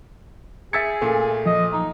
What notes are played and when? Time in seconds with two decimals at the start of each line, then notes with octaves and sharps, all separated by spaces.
0.73 G#4 E5 E6 G#6 A6 B6 C#7
1.01 A#2 A3
1.46 F3 D#5
1.73 D#4